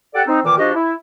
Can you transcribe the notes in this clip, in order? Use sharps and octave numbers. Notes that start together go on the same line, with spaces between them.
G4 A4 D5 F#5
C4 D#4
A#2 D#3 E3 D6
F3 D4 F#4 G4 D#5
E4